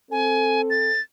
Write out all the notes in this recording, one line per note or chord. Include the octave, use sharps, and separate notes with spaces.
C4 A4 G#5
A6